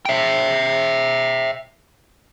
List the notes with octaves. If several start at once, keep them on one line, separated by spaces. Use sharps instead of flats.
E5 G5